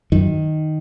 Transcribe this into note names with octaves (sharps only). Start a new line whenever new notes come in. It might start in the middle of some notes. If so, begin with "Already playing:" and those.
F#2 D#3